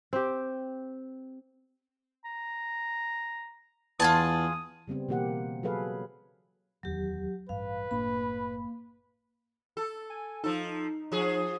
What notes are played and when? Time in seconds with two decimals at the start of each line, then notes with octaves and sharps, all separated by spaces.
0.13 C4 G4
2.25 A#5
4.00 E2 F4 G#4 A5 D#6
4.88 C#3 G3 B3 C4
5.09 B2 E3 A#3 G4 F#5
5.63 F#3 G#4 A4 B4 F5
6.83 D1 E2 D#3 F#3 G4
7.49 A1 G2 B4 F5
7.91 F#1 A2 A#3 D4 B5
9.77 A4
10.10 G#5
10.44 F3 D#4 A4
11.12 F3 G#4